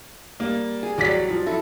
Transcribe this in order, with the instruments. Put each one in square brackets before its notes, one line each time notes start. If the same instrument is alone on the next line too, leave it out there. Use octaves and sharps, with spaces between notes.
[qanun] G3 [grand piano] A#3
[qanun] G#4
[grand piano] A1 D5 B6 [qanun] F#3 G3
[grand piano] F3
[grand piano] E4 [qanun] A4